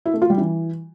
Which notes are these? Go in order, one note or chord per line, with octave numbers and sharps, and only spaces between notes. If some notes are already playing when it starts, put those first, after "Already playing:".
E4
A3
F4
G3
E3